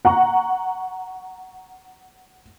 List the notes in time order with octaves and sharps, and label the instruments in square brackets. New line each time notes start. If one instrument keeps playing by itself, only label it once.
[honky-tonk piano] F#5 A#5 C#6